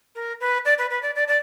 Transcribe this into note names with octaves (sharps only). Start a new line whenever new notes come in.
A#4
B4
D5
B4
B4
D5
D5
D5